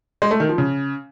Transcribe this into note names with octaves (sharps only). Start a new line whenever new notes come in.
G#3
A3
D#3
F3
C#3